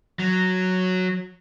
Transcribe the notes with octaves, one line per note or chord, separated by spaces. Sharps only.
F#3